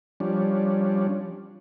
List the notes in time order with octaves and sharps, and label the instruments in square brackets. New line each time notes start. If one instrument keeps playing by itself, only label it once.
[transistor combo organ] F3 G3 C#4 D4